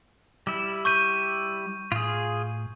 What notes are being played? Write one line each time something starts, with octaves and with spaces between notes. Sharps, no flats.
G3 E4
C#6 G6 D#7
A2 F4 G#4